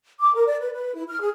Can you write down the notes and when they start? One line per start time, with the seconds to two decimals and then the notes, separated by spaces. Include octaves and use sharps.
0.20 D6
0.34 A#4
0.46 D5
0.60 B4
0.73 B4
0.95 E4
1.08 F6
1.20 G#4